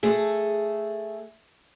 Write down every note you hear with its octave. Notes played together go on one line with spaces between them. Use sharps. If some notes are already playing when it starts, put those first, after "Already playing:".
A3 G#4